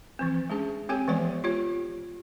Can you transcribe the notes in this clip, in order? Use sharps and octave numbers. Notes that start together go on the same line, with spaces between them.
E3 F3 C4
G#3 C#4 D4 G#4
C4 G4 A4 C#5 G5 G#5
E3 F3 G#3 B3 C#5 D5
F4 G4 C#5